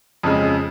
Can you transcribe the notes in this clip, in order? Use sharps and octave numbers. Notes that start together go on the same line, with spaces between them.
F2 C#3 G#3